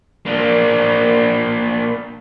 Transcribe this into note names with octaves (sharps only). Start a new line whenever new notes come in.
A#3 D4